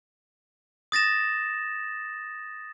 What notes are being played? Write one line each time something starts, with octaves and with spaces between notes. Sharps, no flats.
D#6 A6 A#6 E7